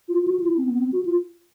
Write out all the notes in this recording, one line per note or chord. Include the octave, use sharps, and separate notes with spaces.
F4
F4
F#4
F4
E4
C4
B3
C4
F#4
F4